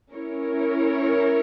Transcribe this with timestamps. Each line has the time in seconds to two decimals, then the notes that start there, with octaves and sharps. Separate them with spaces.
0.14 C#4 E4 A#4 C#5